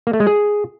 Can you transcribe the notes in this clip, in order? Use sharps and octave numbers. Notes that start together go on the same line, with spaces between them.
A#3
A3
G#3
G#4